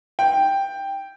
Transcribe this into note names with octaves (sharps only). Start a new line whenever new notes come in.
G5